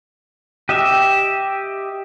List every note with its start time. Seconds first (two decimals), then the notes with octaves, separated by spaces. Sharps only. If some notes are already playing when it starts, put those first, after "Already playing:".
0.69 G4 D#5 E5